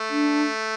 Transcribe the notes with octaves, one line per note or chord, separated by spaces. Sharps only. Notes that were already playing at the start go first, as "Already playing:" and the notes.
Already playing: A3
D4